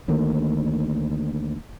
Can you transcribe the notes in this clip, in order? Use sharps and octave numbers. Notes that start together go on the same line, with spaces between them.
D2 D#3 A3 A#3